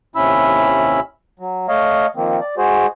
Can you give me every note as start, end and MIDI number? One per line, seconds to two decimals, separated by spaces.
0.16 1.00 39
0.16 1.00 48
0.16 1.00 61
0.16 1.00 64
0.16 1.00 83
0.16 1.00 88
1.39 1.67 54
1.69 2.07 57
1.69 2.07 73
1.69 2.07 75
1.69 2.07 77
2.16 2.40 51
2.16 2.40 53
2.16 2.40 58
2.16 2.40 60
2.41 2.55 74
2.58 2.87 56
2.58 2.87 66
2.58 2.87 68
2.58 2.87 72